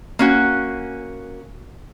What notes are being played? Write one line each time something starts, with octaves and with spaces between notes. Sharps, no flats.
A#3 C#4 F#4